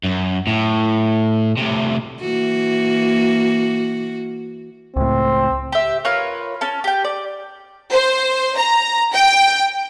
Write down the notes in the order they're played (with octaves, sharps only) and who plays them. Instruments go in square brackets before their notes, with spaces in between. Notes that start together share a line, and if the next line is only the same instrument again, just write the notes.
[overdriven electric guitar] F#2
A2
A2 C3
[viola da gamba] E3 A#3 F#4
[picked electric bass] C#2 A2 [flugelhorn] C4
[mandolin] G4 E5
F4 A#4 B4 C#5
C#4 A5
G4 G5
D5
[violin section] C5
A#5
G5